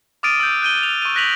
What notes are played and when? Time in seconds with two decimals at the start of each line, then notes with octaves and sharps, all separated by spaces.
0.23 D6 D#6 F6 A6 D7 D#7
0.40 E6 G6
0.62 F#6 G6 D#7 G7
0.83 F7
1.02 C#6 D#7
1.15 F#6 A#6 B6 F7 F#7